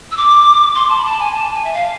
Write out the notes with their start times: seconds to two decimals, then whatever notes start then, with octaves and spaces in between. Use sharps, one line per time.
0.11 E6
0.17 D6
0.75 C6
0.89 A5
0.97 B5
1.05 A5
1.19 G#5
1.34 A5
1.54 G#5
1.64 E5
1.73 F5